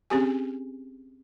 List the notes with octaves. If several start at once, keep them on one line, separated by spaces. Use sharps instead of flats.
C4 C#4 G4 G#4 G#5